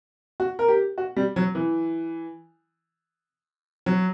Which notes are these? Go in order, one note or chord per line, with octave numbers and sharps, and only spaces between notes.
F#4
A#4
G4
F#4
G3
F#3
E3
F#3